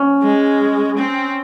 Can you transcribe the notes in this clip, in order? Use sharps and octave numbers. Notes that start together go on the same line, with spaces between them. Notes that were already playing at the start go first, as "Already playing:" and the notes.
Already playing: C#4
G#3
C4